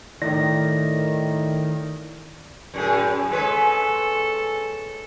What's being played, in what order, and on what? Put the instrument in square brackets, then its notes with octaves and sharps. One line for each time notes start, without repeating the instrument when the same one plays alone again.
[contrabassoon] A2 [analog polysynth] D#3 [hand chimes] D5 A#6
[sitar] F#2 A2 G#4
[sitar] G#3 B4 C#5 [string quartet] A4